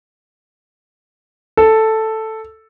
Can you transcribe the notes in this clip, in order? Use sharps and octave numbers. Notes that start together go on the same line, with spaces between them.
A4